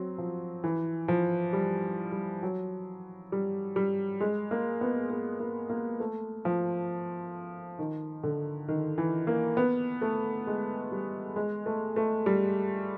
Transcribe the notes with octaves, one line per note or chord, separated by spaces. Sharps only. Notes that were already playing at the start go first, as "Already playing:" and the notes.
Already playing: F#3 C4
F3
E3
F3
G3
G3
F#3
G3
G3
G#3
A#3
B3
A#3
A#3
A#3
A3
F3
D#3
D3
D#3
E3
A#3
B3
A3
G#3
G3
G#3
A3
A3
G3